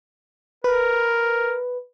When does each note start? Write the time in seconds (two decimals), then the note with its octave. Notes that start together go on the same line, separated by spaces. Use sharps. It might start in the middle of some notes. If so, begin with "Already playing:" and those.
0.64 A#4 B4